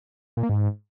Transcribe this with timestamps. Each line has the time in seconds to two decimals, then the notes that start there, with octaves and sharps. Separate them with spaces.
0.37 A#2
0.43 A#3
0.49 G#2